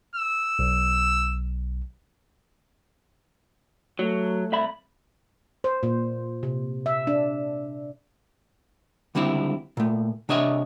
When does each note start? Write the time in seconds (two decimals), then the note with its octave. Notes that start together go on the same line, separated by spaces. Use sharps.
0.16 E6
0.59 B1
3.99 F#3 A3
4.52 C2 E5 B5
5.64 C5
5.83 A#2
6.43 C3
6.86 E5
7.07 D4
9.15 C#2 D3 G3 C4 E4
9.77 A#2 A3
10.29 C3 D4 C#5 D#5 E5